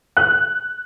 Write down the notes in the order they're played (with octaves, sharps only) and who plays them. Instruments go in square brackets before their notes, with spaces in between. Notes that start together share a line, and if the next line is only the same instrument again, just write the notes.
[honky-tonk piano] F#6